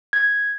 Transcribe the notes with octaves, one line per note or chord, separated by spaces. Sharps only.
G#6